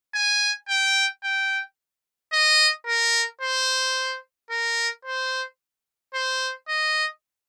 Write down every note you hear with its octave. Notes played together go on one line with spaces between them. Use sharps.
G#5
G5
G5
D#5
A#4
C5
A#4
C5
C5
D#5